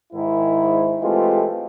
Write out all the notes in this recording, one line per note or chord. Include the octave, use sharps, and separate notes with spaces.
G#2 D#3 E4
E3 G#3 A3 C4 F4 G4